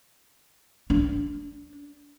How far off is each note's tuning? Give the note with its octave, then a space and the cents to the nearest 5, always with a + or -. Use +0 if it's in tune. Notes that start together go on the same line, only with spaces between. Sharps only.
D4 -20